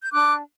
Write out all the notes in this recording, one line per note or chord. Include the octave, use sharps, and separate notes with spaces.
G6
D4 D6 F#6